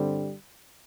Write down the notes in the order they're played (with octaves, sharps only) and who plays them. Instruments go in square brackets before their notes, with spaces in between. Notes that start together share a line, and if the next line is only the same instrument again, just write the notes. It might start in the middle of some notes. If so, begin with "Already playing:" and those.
Already playing: [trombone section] G2 D3 G3 C4